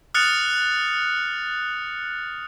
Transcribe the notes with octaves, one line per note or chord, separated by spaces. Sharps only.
D#6 F6 F#6 A6 C#7 F7